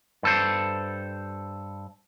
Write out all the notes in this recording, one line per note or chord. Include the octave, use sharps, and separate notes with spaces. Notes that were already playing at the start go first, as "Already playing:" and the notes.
G2 A4 C5